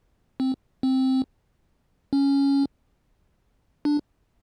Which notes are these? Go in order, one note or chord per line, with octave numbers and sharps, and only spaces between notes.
C4
C4
C#4
D4